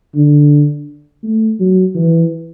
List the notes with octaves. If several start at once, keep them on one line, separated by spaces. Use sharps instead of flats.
D3
A3
F#3
E3